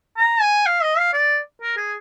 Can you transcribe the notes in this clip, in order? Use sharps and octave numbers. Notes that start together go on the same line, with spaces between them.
A#5
G#5
F5
D#5
F5
D5
A#4
G#4